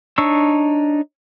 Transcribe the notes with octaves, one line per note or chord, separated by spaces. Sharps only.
D4 D#4 C#5 C#6 E6